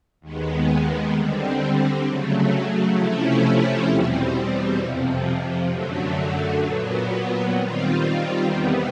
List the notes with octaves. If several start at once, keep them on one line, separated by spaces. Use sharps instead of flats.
D#2 D#3 G#3 B3
D3 G3 C4
C#3 F#3 A3
C3 F3 A3 C#4 E4
E2 B2 G3 C4
F2 C3 F3
F#2 D3 F#3 A3
A#2 F#3 B3
D#3 G3 C4 F4
E2 C3 D#3 G3 B3